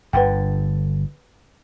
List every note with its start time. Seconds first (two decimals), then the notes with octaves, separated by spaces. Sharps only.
0.13 G1 D3 B4 F#5 G5